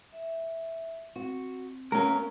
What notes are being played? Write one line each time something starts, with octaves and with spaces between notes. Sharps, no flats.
E5
C4 F#4
A3 A#3 C#4 A#4